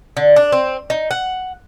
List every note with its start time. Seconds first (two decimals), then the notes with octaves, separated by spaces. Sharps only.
0.17 D3
0.36 D4
0.52 C4
0.90 D#4
1.11 F#5